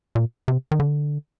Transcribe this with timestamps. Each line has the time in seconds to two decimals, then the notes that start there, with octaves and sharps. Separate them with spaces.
0.15 A#2
0.48 C3
0.71 D#3
0.80 D3